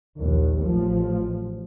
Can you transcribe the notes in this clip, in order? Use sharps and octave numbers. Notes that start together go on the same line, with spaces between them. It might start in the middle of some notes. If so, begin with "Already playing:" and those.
A#1 D#2
A1 F3